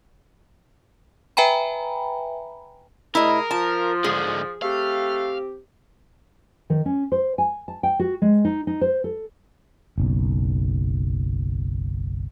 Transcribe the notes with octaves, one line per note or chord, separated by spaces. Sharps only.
B4 E5 G5 G#5 A#5 B5
C3 A3 E4 G#4 A#4 D#5
F3 F4 A5
G#2 D3 G#4
A3 C4 G4 F5
D#3
C#4
C5
G#5
A5
G5
F#4
G#3
D#4
D#4
C5
A4
F#1 B1